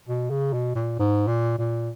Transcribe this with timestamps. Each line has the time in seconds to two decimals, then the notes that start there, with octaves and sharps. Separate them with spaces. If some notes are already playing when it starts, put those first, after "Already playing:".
0.08 B2
0.30 C#3
0.53 B2
0.75 A#2
0.99 G#2
1.28 A#2
1.58 A#2